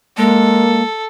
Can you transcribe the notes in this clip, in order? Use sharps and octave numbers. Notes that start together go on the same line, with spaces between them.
G#3 A#3 A4